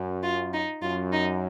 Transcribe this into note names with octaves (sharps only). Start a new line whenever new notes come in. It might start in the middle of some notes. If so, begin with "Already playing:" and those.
Already playing: F#2
F4
D#4
F#2 F4
D#4